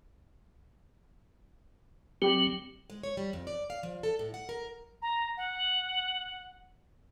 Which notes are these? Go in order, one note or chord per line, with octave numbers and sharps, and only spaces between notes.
F#3 C4 G4
G#3
C#5
G3
F2
D5
F5
F3
A4
A2
F#5
A#4
A#5
F#5